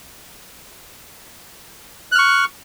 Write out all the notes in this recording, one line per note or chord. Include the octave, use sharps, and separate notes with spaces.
C#6 F6 F#6